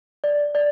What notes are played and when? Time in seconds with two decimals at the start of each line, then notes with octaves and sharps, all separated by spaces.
0.24 D5
0.55 D5